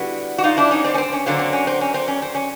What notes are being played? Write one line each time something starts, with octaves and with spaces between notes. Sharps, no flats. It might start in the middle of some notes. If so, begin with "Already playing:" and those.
Already playing: D3 G3 B3 E4 F#4
F#4
D#4 F4
D4 E4
C#4 D#4
C4 D4
C#4
C4
C#4
D3 F#3 A#3 C4
C4
C#4
C4
C#4
C4
C#4
C4
C#4